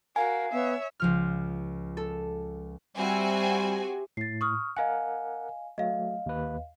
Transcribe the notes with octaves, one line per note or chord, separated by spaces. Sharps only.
F#4 A#4 F5 G#5
B3 C#5 E5
C#2 F3 F6
A4
G3 C4 F#4 G4 E5 G#5
A2 A6 C7
C#6 D#6 F6
A#4 D#5 F5 F#5 G#5
F#3 A3 D#5 F5
D#2 B4